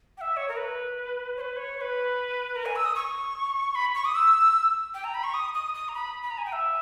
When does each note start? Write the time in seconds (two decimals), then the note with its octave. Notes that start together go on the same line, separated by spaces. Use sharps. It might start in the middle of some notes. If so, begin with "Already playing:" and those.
0.18 G5
0.21 E5
0.37 C#5
0.48 A#4
0.57 B4
1.37 C#5
1.41 B4
1.56 C#5
1.76 C#5
1.81 B4
2.56 A#4
2.66 G#5
2.76 E6
2.86 D#6
2.95 C#6
3.75 B5
3.95 C#6
4.05 D#6
4.15 E6
4.94 G5
5.04 A#5
5.14 B5
5.24 C#6
5.34 D#6
5.54 D#6
5.74 D#6
5.89 A#5
5.94 B5
6.23 B5
6.30 A#5
6.38 G#5
6.46 G5
6.53 E5